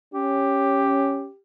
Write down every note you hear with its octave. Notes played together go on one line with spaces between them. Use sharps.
C#4 G4